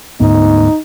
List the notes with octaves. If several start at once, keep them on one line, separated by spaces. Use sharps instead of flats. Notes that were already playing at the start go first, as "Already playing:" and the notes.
D2 G#2 B3 D#4